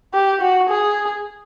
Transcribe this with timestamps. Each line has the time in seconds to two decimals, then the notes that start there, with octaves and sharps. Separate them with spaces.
0.14 G4
0.41 F#4
0.69 G#4